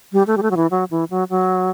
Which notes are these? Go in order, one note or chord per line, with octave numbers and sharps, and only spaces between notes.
G3
A3
G3
A3
F#3
E3
F#3
E3
F#3
F#3